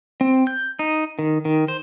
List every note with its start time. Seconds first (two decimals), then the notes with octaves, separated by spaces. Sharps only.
0.21 C4
0.47 G6
0.79 D#4
1.19 D#3
1.45 D#3
1.68 C5